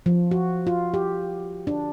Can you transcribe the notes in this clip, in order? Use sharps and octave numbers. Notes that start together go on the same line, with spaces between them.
F3
F#4
F4
G4
D4